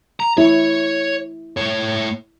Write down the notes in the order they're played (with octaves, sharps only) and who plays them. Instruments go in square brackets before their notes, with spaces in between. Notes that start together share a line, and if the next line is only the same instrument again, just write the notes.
[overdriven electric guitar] A#5
[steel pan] E4 [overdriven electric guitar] C#5
[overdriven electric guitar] A2 C#5